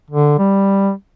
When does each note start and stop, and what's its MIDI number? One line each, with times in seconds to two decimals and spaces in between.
0.11 0.36 50
0.39 0.91 55